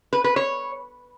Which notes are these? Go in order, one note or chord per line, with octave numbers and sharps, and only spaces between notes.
B4
B4
C#5